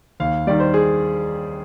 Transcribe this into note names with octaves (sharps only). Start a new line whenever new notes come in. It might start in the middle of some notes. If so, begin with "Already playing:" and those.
D#2 F5
D#3 G3 D5
C5
G#4